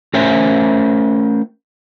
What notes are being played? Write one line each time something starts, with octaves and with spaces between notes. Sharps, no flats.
A3 C#4 A#4 C5 E5 G#5